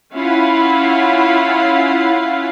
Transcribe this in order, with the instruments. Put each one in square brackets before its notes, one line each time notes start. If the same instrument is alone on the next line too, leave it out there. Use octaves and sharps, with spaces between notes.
[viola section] C#4 E4 F4 F5 F#5 B5